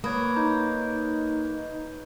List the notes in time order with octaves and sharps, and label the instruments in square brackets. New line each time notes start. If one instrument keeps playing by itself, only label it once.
[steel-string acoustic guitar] A#3 [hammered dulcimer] B4 C#5 [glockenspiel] D#6 G#6
[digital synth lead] D#4 [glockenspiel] A#5 G6